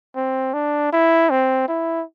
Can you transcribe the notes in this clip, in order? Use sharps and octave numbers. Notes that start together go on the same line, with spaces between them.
C4
D4
E4
C4
E4